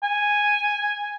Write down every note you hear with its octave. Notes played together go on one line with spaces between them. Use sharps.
G#5